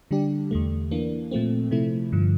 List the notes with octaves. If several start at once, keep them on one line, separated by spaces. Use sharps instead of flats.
D3 G3 D4 G4
E2 D3 A3
E3 A#3 D4
A#2 F3 A3 C4
C3 F3 A3 E4
G2 D3 F3